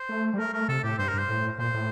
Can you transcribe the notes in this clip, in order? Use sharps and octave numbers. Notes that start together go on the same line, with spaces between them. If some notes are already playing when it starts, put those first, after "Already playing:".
Already playing: C5
A3
G3
A3 A#4
A3 A#4
C3 A4
A2 G4
G2 C5
A#4
G2 C5
A2
A#2 C5
A2